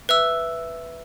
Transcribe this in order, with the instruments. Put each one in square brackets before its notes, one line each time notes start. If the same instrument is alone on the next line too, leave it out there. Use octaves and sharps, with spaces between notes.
[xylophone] B4 E5 E6